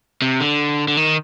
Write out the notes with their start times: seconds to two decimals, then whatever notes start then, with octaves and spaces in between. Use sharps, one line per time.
0.22 C3
0.40 D3
0.88 D3
0.97 D#3